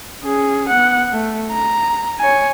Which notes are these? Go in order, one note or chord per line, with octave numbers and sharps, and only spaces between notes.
C#4 G#4
B3 F#5
A3
A#5
C#5 G#5